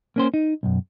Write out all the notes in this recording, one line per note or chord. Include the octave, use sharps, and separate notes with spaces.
A#3 C#4 C5
D#4
B1 F#2